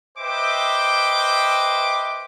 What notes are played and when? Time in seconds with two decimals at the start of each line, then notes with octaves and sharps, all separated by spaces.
0.18 B4 C5 D#5 E5 G5 D6